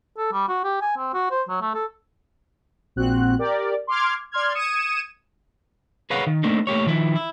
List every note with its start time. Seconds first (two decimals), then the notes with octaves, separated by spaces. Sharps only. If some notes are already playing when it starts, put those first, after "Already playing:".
0.17 A4
0.32 G3
0.49 F#4
0.64 G4
0.81 G#5
0.97 C4
1.14 F#4
1.31 C5
1.49 F#3
1.61 A3
1.74 A4
2.96 A#1 C4 F#4 F#6
3.39 G4 A#4 D5
3.87 C6 D6 F6 G#6
4.32 D5 C6 F6 G#6
4.55 D#6 G#6 C#7 D#7 E7
6.10 G#4 A#4 B4 C#5 F5 F#5
6.27 D#3
6.43 A3 A#3 C4 D4 D#4
6.67 A3 A#3 G4 C#5
6.86 D#3 F3 E4
7.15 E4